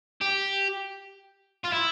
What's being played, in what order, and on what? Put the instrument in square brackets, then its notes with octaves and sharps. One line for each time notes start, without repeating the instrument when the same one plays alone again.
[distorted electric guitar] G4
F4
E4